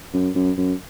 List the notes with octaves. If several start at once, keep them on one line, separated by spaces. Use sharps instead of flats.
F#2
F#2
F#2